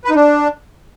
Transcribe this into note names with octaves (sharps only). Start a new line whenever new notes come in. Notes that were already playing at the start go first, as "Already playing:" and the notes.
B4
D#4
D4